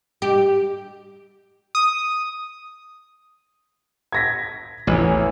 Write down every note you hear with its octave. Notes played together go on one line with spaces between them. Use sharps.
G4
D#6
G#6 A#6 B6
A1 E2 E3